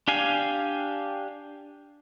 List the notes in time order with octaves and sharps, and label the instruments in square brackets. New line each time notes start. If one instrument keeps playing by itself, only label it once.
[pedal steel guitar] D4 G4 F5 G#5